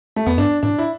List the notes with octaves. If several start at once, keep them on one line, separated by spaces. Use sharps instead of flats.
A3
E2 B3
G2 D4
A2 D4
E4